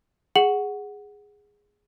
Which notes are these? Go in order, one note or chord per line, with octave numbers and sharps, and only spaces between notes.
G#4 F#5 C#7 F#7